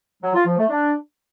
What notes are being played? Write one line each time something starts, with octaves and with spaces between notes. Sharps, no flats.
F#3
F4
F3
A3
D4